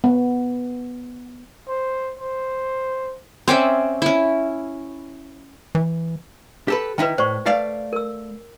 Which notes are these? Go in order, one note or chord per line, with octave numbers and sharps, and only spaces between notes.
B3
C5
C5
C4 C#4 D5 E5
C#4 E4
E3
G4 A4 B4
D#3 D#4 E4 B4 G5
A2 C5 D5 C#6
A3 B4 D5 F5
A#4 E6